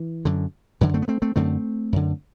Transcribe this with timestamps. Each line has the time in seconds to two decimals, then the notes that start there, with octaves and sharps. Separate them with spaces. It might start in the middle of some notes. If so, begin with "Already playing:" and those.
Already playing: E3
0.25 F#2 D3
0.81 F#2 D3 E3
0.94 A3 C4
1.02 B3
1.08 A3 C4
1.22 A3 C4
1.36 F#2 D3 A3 C4
1.92 F#2 D3